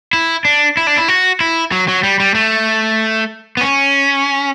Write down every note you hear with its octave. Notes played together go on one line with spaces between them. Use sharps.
E4
D4
E4
D4
E4
F#4
E4
F#3
F#3
G3
G3
A3
B3
C#4